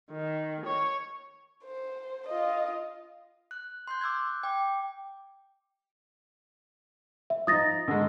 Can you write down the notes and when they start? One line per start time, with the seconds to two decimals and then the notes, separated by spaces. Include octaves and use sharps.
0.11 D#3
0.66 C#5
1.64 C5
2.28 F4 D#5
3.51 F#6
3.88 C6 F#6 G6
4.01 D6 E6 G6 G#6
4.43 G5 D6
7.30 E5
7.47 F3 D#4 D#6 A6 A#6
7.88 D3 D#3 G#3